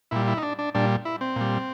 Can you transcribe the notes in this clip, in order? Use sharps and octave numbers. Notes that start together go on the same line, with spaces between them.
A#2 G3 E4
E4
D#4
D4
D4
A#2 G3 D4
E4
C4
A#2 G3